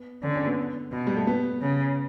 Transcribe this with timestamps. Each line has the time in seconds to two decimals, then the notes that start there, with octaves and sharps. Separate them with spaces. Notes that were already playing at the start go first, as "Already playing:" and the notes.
Already playing: B3
0.23 D3 C#4
0.35 C#4
0.46 B3
0.92 B2
1.07 G3
1.17 A3
1.27 B3
1.61 C#3